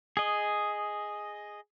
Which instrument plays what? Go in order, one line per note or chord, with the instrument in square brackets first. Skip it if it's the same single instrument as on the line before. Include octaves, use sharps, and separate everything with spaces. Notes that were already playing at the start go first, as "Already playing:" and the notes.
[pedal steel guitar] G#4 D#5